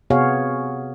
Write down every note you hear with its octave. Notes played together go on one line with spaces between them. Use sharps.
C3 B3 F#4 G#4 C#5 F5